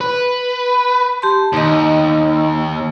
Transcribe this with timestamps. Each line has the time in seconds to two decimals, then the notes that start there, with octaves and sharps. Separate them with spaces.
0.01 B4
1.22 G4 A5 C6
1.53 D#2 D#4 D#5